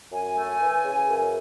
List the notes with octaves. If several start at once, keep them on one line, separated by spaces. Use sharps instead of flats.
F#2 G#5
A3
E3
C#3
F#2